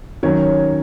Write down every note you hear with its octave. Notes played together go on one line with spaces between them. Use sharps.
D#3 F#3 C#4 C#5